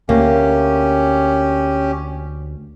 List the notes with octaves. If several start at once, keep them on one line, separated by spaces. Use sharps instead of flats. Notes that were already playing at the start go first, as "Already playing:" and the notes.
D2 A#3 C#4 G4